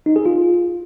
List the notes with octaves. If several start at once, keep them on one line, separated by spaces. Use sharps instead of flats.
D#4
G#4
F4